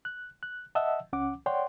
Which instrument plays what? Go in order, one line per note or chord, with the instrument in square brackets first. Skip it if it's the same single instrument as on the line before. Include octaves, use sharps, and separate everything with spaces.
[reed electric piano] F#6
F#6
D#5 E5 F#5 A5 E6
C#2 C#4 F#5 D6
C#5 D5 F#5 G5 C6